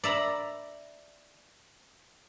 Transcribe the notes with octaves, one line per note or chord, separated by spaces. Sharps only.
D5 E5 A#5 B5